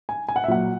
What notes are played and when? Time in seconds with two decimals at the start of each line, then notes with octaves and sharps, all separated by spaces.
0.09 G#5
0.28 G#5
0.36 F#5
0.44 E5
0.48 A#2 F#3 F#5